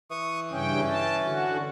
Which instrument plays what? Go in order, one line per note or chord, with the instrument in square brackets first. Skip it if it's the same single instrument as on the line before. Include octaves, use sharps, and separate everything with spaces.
[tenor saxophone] E3 [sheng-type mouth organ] C#6 D#6
[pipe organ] G2 C#3 G5 [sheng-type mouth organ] C#4
[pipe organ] A5
D3 F#4